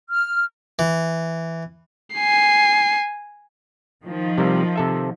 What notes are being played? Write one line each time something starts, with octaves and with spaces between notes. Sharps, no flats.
F6
E3
G#5 C7
D#3 F3
C3 G3 A#4
C3 A4 E5